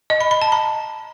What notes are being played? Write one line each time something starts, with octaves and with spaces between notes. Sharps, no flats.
D#5
B5
B5
A5
A#5